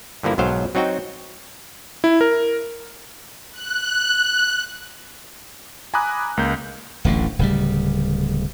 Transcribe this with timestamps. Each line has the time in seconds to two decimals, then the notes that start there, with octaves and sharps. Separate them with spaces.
0.23 G2 D3 F3 A#3 E4
0.38 B1 G#2 F#3 C5 F5 G5
0.75 F#3 C4 D#4 F#4 G5
2.04 E4
2.21 A#4
3.52 F#6
5.94 G#5 A#5 B5 D6 D#6 F#6
6.37 C#2 A#3 G6
7.05 D1 A1 D3
7.39 D1 C#3 G3